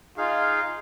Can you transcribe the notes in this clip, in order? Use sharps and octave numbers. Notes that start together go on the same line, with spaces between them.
D#4 F4 G#4 F5